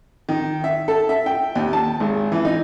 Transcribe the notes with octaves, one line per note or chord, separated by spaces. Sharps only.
D#3
E5
A4
E5
G5
D#2
A5
G#1
E3
D#4